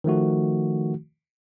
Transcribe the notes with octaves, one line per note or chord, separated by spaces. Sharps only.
D#3 F3 A3 F#4